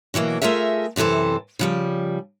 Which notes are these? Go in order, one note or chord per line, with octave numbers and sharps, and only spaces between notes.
B2 E3 F#3 A#3
A3 F4 G#4 A#4 E5
F#2 C3 E3 A4 C5
C#3 F3 G3